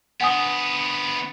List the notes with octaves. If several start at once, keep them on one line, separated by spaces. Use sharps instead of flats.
D2 B3 F#5 G#5 D#6